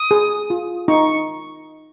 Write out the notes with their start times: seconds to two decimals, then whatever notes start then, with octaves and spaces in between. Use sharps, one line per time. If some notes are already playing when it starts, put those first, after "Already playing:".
Already playing: D#6
0.11 G#4
0.50 F4
0.88 D#4 C#6